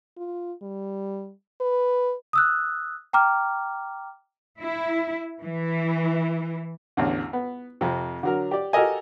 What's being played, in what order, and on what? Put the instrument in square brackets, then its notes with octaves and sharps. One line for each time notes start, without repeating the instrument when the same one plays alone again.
[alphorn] F4
G3
B4
[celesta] D#6 E6 F#6
G5 A#5 D6 F6
[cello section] E4
E3
[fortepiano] A1 E2 D3
B3
F2 C3
D3 F#3 A#4
G4 D5
F#4 G4 A4 A#4 D#5 G#5